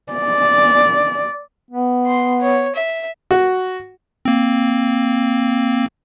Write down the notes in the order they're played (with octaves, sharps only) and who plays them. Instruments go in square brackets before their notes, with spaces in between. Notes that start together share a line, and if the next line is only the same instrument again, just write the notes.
[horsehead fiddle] D5
[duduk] B3
[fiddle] C6
C#5
E5
[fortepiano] F#4
[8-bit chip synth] A#3 C4